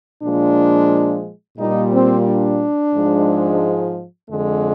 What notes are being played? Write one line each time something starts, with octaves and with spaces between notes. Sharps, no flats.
A#2 F3 G#3 D4
A#2 G3 D#4
C4
D4
G#2 F3 G#3
F2 D3 G#3